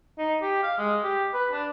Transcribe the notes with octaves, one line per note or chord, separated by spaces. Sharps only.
D#4
G4
F5
G#3
G4
B4
D4